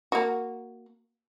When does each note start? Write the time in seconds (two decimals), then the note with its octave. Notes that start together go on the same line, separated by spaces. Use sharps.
0.12 A#3 F#4